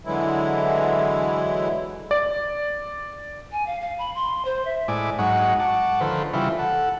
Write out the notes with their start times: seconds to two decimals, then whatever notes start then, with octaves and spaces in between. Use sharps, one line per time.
0.05 D3 E3 F#3 G#3 E4
2.11 D5
3.52 G#5
3.67 F5
3.81 F5
3.98 B5
4.15 C6
4.45 C5
4.65 E5
4.88 A2 G#3 E4 D5 G#5 D6
5.19 G#2 F#3 G#3 D#4 F#5 C#6
5.60 F#5 A5 C#6 D6
6.01 D3 D#3 F3 A4 B4 C5
6.33 C#3 E3 G3 E4 F4
6.59 A4 F#5